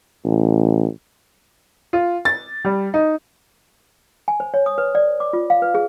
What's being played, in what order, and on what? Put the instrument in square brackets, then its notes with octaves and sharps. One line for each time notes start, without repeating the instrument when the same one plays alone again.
[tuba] A1
[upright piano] F4
A6
G3
D#4
[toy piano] G#5
C5
C#5
D#6
B4
D5
D6
F4
F5
B4
G#4